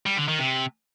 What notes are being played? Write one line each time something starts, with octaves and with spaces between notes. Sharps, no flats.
G3
D3
D#3
C3